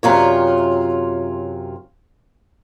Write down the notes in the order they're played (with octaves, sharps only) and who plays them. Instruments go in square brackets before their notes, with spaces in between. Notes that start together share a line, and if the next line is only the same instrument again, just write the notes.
[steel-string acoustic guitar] F#2 C3 F4 C#5